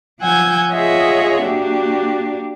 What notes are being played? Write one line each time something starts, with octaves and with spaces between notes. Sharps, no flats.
F3 F#5 G#5 E6 G6 G#6
F4 G#4 C#5 D#5 E5 F#5
A#3 D4 F#4 G4